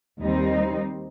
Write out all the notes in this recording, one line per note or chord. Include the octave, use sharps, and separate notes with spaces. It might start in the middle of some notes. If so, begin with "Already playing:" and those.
D#2 D#3 G3 C4 D#4